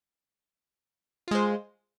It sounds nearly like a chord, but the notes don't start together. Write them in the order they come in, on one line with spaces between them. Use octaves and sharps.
F4 G#3 C5